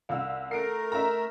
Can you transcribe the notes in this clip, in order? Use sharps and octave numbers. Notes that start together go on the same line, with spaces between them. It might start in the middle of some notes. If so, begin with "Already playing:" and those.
C2 F5 E6
A3 A#4 C7 D7
E5 A#5